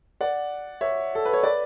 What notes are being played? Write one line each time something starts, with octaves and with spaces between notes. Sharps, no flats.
D5 F#5
C#5 E5
A4
B4
C#5
B4 D5